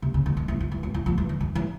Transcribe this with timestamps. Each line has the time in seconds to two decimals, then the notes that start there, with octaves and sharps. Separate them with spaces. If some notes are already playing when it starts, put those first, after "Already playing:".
0.02 C3
0.14 C#3
0.26 D#3
0.37 D#3
0.48 E3
0.60 F3
0.72 E3
0.83 F3
0.94 E3
1.06 F3
1.18 E3
1.29 D#3
1.40 D#3
1.55 E3